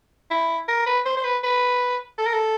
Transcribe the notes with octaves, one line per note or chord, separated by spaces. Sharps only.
E4
A#4
B4
C5
C5
B4
B4
A4
A#4
A4